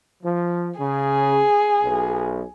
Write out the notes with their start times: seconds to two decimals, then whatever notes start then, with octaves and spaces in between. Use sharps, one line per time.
0.23 F3
0.79 C#3 G#4
1.83 B1